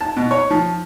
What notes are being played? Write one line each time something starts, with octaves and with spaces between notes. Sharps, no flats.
A5
B2
C#5
F3